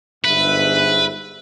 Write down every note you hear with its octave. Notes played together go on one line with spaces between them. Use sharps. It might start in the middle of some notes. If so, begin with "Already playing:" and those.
G1 G#2 B4 E5